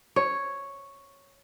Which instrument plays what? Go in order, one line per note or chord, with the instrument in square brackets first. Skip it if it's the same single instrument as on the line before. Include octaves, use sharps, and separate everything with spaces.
[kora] C#5